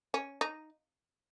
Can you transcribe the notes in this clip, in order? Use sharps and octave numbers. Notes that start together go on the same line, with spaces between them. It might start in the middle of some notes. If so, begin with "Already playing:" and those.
C#4
D#4